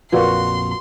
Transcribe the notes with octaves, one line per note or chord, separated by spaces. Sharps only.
A#1 F2 F4 F#4 A#4 B4 D5 C6